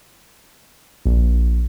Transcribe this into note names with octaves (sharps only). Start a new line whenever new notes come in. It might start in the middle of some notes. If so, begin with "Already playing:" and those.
A#1